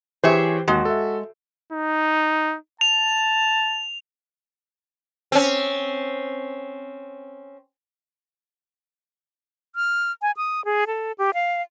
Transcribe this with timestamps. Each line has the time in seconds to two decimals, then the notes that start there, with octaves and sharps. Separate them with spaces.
0.24 E3 G4 G#4 C5 C#5 E5
0.68 D#2 G#3 F#4
0.85 A4 E5
1.72 D#4
2.81 A5 F7
5.32 C4 C#4
9.76 F6
10.22 G#5
10.37 D#6
10.65 G#4
10.87 A4
11.18 G4
11.34 F5